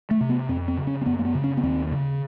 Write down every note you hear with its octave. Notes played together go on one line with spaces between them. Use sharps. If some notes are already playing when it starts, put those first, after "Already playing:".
A3
C3
B3
F2 C4
C4
C#3
C#4
C4
F#2 B3
A#3
B3
C#3
C#4
B3
D#2 C4
C#3